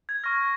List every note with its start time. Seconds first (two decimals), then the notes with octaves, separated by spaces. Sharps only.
0.09 G#6
0.24 C#6 F6 A#6